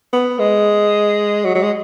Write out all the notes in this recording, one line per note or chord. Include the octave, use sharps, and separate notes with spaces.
B3
G#3
F#3
F#3
G#3